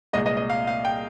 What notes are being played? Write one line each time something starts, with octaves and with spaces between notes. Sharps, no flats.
C2 A#2 G#3 D#5
D#5
D#5
F5
F5
G5